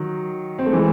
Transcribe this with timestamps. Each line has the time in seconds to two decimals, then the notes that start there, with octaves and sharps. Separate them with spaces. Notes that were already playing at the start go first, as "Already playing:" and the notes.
Already playing: D#3 F#3
0.58 C4
0.66 A3
0.73 E3 G#3